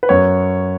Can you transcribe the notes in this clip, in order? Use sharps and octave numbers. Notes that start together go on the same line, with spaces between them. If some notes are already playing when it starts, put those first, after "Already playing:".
B4
F#2 C#5